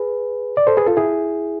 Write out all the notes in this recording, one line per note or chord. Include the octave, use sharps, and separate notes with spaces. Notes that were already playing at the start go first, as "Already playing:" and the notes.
Already playing: G#4 B4
D5
A4 C5
G#4 B4
F4 A4
E4 G#4